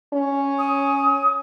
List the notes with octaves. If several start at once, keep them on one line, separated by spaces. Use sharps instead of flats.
C#4
D#6